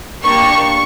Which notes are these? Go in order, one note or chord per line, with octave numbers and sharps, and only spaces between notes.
A#3 D4 G4 C#6